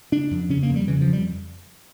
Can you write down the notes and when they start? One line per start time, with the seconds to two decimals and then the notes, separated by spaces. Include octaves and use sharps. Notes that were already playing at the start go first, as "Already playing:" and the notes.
0.12 C#3 D4
0.31 F2
0.49 C#3 C#4
0.63 A#3
0.69 F2
0.76 G3
0.88 C#3 E3
1.01 F3
1.07 F2
1.13 G3